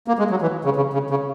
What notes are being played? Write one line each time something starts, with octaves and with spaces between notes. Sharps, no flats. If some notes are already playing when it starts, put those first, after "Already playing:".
A#3
G#3
F#3
E3
C#3
C#3
C#3
C#3